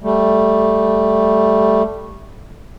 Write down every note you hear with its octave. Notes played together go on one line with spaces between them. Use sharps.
G3 A3